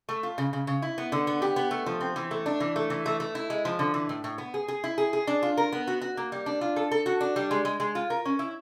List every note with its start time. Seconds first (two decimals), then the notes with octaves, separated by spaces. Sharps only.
0.09 A3
0.23 F4
0.38 C#3
0.53 C#3
0.67 C#3
0.82 E4
0.98 B3
1.12 D3
1.27 B3
1.42 G4
1.56 B3
1.71 A3
1.86 F3
2.01 C4
2.16 E3
2.31 A3
2.46 D4
2.60 E3
2.76 A3
2.90 E3
3.06 A3
3.20 A3
3.35 E4
3.50 G#3
3.65 F3
3.79 D3
3.94 E3
4.09 A2
4.24 A2
4.38 B3
4.54 G#4
4.68 G#4
4.84 E4
4.98 G#4
5.13 G#4
5.27 D4
5.43 F4
5.57 A#4
5.72 B3
5.87 F#4
6.01 F#4
6.17 A#3
6.32 G3
6.46 D4
6.61 F4
6.76 A4
6.91 A4
7.06 F#4
7.21 D4
7.36 G3
7.51 G#3
7.65 G#3
7.80 G#3
7.95 F4
8.10 A#4
8.25 C#4
8.39 E4